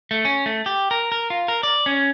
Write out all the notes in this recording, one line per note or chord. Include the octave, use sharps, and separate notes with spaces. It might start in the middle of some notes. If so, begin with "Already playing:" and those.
A3
C#4
A3
G4
A#4
A#4
F4
A#4
D5
C#4